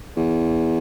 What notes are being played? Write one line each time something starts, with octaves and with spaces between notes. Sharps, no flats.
E2